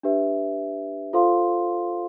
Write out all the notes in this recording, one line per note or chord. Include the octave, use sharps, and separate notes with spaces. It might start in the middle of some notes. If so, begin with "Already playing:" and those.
D4 G4 B4 E5
F4 A4 C5 F5 C6